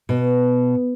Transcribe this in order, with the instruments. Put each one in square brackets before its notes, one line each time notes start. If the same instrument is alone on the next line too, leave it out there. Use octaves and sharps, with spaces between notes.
[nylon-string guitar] B2